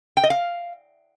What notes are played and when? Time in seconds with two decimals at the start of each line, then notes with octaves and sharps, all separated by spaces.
0.17 G5
0.24 D#5
0.30 F5